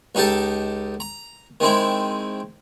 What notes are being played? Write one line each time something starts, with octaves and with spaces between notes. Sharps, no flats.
C#2 D#4 G4 A4 A5
A#5
D#3 G#3 C4 E4